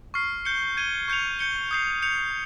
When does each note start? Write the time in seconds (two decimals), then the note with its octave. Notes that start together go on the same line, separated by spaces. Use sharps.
0.14 C#6 F6 C7
0.45 G6 C#7 G7
0.77 G#6 D#7 G7
1.08 C#6 G6 C#7 F7
1.39 G6 C#7 G7
1.71 D#6 G6 C7 F7
2.02 G6 C#7 F7